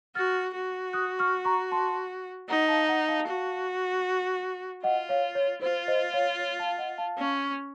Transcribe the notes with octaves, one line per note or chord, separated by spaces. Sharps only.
F#4 F6 A6
F#4
D#6 F#6
C#6 F6
A#5 C#6
A5 C6
D#4 F#5 A#5
F5 A5
F#5 A#5
F5 A5
F#4
F4 D#5 F#5
C#5 F5
C#5
F4 C5
C5 D#5
C#5 F5
C#5
F5 A5
D#5 F#5
F5 A5
C#4